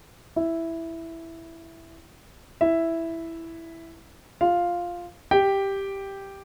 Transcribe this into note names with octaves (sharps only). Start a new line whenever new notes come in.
E4 E5
E4 E5
F4 F5
G4 G5